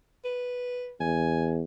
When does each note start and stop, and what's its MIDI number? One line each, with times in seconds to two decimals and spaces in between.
0.25 0.93 71
1.00 1.63 40
1.00 1.56 80